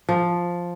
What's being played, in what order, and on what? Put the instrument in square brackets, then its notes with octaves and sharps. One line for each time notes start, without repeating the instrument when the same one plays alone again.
[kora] F3